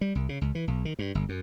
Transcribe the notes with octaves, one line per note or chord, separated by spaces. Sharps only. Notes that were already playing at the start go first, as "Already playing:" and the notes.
G3
C2
C#3
C#2
E3
B1
D#3
G2
G1
F#2